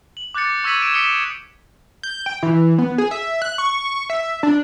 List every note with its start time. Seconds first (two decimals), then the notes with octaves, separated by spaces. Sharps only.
0.17 F#7
0.34 D6 F#6 G6 A6 C#7
0.64 C#6 E6 G#6 B6 D#7 F#7
0.82 G#6 D7 E7
0.94 D#6 B6 C#7 D7 E7 G7
1.09 C#7
2.03 G6
2.26 G5
2.43 E3
2.78 B3
2.98 G#4
3.11 E5
3.42 F#6
3.58 C#6
4.10 E5
4.43 D4